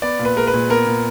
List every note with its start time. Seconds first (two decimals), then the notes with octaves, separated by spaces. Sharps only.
0.02 B3 D5
0.19 A#2
0.25 B4
0.36 G#3 A#4
0.47 B4
0.54 A#2
0.70 B3 A#4
0.86 A#2